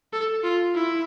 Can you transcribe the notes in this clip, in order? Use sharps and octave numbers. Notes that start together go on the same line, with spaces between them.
A4
F4
E4